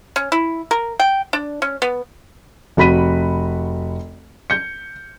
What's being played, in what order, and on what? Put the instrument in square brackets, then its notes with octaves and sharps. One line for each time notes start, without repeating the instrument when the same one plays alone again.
[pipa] C#4
E4
A#4
G5
D4
C#4
B3
[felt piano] F1 F#4 B5 B6 D#7
G6 C#7